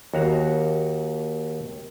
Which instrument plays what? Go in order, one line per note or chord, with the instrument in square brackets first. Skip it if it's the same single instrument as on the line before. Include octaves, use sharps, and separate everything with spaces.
[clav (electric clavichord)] D#2 F#4 A#5